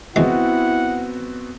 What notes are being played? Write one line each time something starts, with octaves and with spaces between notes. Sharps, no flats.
E2 E3 G#3 B3 C4 E4 F#4 F#5